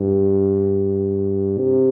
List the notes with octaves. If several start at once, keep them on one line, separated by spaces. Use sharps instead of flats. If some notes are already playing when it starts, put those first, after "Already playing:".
Already playing: G2
C3